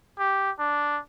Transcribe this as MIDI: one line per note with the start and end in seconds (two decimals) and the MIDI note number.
0.19 0.51 67
0.59 0.99 62